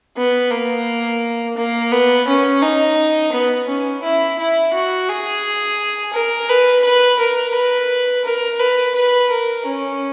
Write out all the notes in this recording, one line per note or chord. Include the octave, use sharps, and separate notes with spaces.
B3
A#3
A#3
B3
C#4
D#4
B3
C#4
E4
E4
F#4
G#4
A#4
B4
B4
A#4
B4
A#4
B4
B4
A#4
C#4